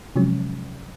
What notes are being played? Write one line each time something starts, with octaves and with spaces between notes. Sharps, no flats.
C3 F3 F#3 G#3 C#4